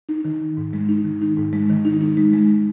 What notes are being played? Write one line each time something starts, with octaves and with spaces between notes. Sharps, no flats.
D#4
D#3
D#3
G#2
G#3
D#4
D#3
D#4
G#2
G#3
D#3
D#4
D#4
G#3
G#3